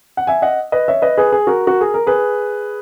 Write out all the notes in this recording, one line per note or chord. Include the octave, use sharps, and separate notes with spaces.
F#5
E5 G#5
D#5 F#5
B4 D#5
C#5 E5
B4 D#5
G#4 B4
G#4
F#4 A#4
F#4
G#4
A#4
G#4 B4